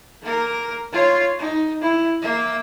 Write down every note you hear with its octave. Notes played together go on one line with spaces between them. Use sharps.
A#3 A#4
F4 C#5
D#4
E4
A#3 E5